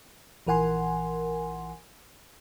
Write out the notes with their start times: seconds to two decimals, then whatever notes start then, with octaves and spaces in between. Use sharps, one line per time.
0.47 A#1 E3 A#4 F#5 G#5 C6